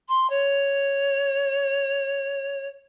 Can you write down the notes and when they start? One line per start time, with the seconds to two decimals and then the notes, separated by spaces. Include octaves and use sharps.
0.08 C6
0.30 C#5